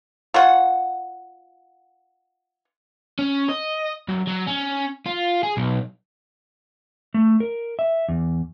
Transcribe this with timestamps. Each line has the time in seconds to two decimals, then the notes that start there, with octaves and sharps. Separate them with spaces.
0.34 F4 C#5 F#5
3.19 C#4
3.49 D#5
4.08 F#2
4.27 F#3
4.47 C#4
5.06 F4
5.43 G#4
5.57 B1
7.14 A3
7.40 A#4
7.79 E5
8.09 E2